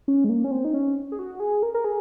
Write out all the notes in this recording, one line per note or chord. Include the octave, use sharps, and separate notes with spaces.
C#4
G#3
A#3
C#4
C4
D#4
C#4
G#4
F#4
G#4
A#4
A#4
G#4